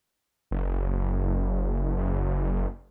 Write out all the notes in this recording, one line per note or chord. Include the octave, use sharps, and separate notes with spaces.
F#1
F#1